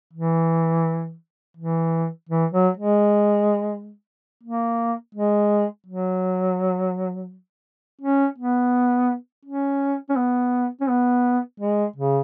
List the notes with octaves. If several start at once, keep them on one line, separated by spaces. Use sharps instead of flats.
E3
E3
E3
F#3
G#3
A#3
G#3
F#3
C#4
B3
C#4
C#4
B3
C#4
B3
G#3
C#3